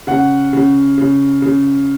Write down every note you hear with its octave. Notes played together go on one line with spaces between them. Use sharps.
C#3 F#5
C#3
C#3
C#3